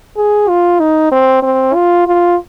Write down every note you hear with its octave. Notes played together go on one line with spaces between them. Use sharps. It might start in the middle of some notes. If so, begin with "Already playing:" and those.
G#4
F4
D#4
C4
C4
F4
F4